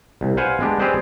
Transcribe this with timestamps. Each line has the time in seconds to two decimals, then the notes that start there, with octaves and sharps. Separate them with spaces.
0.21 C2
0.37 B4 C5 F5 F#5 G#5
0.60 G#3 B3 D4 G4
0.79 C4 G4 G#4 B4 C5 D5